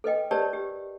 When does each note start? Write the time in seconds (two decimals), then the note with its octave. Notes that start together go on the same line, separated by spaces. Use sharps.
0.04 A4 B4 D#5 G5
0.31 G4 A#4 B4 C#5 D5 A5
0.53 G4